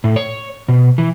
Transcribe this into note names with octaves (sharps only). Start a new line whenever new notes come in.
A2
C#5
B2
E3